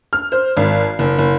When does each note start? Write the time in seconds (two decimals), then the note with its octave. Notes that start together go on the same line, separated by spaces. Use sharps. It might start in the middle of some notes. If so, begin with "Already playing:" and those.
0.13 F6
0.32 C5
0.57 G#1
0.99 F#1
1.19 F#1